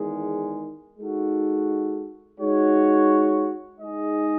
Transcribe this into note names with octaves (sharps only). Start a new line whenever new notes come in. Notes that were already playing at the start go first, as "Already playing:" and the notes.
Already playing: E2 D#3 G#3
G#3 D#4 F#4 A4
G#3 D#4 F#4 C#5
G#3 D#4 G#4 D#5